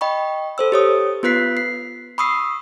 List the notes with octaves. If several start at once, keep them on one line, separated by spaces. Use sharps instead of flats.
D#5 G5 B5 C#6
A4 C5 E6
G4 C#5 D#6
B3 F4 B4 F#6 B6 C7
C7
B5 C#6 D#6 E6 C7